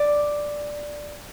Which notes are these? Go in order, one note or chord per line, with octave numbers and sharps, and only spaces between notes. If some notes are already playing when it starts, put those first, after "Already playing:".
Already playing: D5